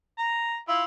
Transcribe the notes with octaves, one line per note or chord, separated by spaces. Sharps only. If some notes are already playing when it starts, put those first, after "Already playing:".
A#5
E4 F4